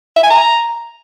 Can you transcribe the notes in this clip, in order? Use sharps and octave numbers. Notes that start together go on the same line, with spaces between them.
E5
G#5
A#5